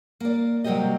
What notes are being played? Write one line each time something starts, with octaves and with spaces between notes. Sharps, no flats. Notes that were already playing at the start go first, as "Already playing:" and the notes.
A#3 D5
C3 F#3 G3 A#3 G4 D#5